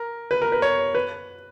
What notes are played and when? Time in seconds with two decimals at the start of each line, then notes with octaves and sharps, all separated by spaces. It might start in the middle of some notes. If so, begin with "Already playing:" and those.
Already playing: A#4
0.31 B4
0.42 A#4
0.52 B4
0.62 C#5
0.95 B4